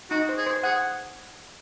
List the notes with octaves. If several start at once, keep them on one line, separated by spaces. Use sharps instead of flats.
D#4 F#4
C5
G#4
C5
G#4 F#5